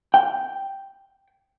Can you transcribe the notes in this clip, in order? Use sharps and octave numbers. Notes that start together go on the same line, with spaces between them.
G5